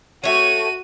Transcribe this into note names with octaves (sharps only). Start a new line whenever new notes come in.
A3 F#4 C#5 D#7